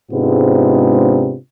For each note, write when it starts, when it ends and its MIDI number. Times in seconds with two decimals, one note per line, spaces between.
0.11 1.36 44
0.11 1.36 48
0.11 1.36 56
0.11 1.36 59
0.11 1.36 62
0.11 1.36 65